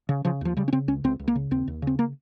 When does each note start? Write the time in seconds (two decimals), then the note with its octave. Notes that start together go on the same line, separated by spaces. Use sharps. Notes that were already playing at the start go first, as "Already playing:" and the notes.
0.09 C#3
0.25 C#3 F3
0.41 D#2 F3
0.57 C#3 G3
0.68 C#4
0.73 C#3 C4
0.88 C#2 C#4
1.04 C#2 C4
1.19 C#2
1.28 A#3
1.35 C#3
1.51 D#2 C4
1.68 D#2
1.82 C#3 C4
1.99 A#3